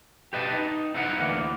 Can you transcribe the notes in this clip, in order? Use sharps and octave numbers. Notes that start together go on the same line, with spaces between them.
G4 B4 D#5 A5
D#4
D#4 E4 B4 C5 F#5 A#5
D2 E3 A#3